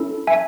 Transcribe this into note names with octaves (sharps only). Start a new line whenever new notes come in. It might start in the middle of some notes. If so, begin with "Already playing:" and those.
Already playing: C#4 E4 A4
E5 G#5